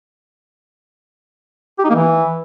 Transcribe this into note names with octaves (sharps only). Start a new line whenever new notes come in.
G4
D#4
A#3
E3